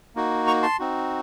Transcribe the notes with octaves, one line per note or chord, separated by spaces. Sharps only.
A#3 D#4 F#4
A#5 C#6
A5 C6
C4 D#4 F#4